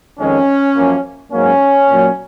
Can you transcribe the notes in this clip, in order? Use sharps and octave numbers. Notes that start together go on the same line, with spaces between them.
F2 D#3 G#3 C#4
F#2 F3 A#3
G#2 F#3 A#3 C#4
A#2 F#3 A#3